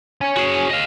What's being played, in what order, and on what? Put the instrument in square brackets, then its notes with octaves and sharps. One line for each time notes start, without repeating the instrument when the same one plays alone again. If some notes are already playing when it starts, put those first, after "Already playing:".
[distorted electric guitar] C#5 G#5
[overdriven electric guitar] F#4 G#4
D#5 F5